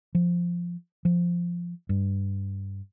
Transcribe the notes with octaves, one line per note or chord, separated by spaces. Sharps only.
F3
F3
G2